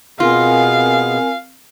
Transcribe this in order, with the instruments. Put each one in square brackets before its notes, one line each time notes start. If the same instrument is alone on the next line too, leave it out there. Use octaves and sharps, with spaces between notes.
[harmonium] B2 B3 G#4 [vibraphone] C4 A#4 G#5 [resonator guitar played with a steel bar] F4 [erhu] F5